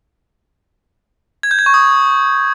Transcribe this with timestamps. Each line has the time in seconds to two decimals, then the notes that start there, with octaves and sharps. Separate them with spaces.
1.43 G#6
1.51 G6
1.59 G#6
1.66 C#6
1.74 D#6